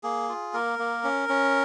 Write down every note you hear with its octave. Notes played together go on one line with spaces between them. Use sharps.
A#3 G#4
F4
A#3 A#4
A#3
C#4
C#4